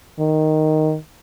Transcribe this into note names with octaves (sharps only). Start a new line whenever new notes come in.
D#3